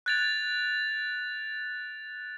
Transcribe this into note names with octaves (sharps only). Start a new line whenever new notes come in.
F#6 G#6 A6 D7 F7